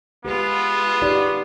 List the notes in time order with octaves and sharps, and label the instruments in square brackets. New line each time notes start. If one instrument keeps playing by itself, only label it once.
[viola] G#3 F4 [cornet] B3 [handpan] G4 B4
[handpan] D#4 G4 D5